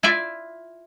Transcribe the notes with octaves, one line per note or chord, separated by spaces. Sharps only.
E4 F4 D5 E5